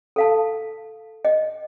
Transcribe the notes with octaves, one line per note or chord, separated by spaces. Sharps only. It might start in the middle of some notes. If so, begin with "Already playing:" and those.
A4 F5 A5
D#5